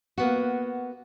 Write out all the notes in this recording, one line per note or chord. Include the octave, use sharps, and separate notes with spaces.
A#3 B3 F#4